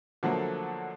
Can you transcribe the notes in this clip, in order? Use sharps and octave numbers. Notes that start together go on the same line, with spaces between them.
D3 F3 F#3 A3 A#3